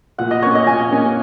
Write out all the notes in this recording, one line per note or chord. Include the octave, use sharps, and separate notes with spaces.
A#2 F#5
D#5
A#3 C#4 C#5
D#5
A#2 G#5
A#3 C#4